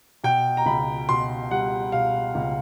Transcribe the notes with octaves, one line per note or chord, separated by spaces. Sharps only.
B2 G5
A#5
C#2 B5
B2 C6
G3 F#5
B2 F5
C#2